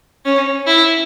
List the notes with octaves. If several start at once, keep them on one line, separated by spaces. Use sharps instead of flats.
C#4
E4